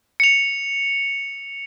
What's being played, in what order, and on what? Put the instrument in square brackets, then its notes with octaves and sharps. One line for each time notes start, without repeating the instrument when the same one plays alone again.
[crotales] C#7 F7